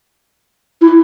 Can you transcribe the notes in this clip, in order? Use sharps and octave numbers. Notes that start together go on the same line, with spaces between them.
E4